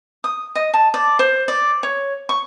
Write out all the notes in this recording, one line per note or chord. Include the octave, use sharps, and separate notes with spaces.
D#6
D#5
A5
D5
C5
D5
C#5
C#6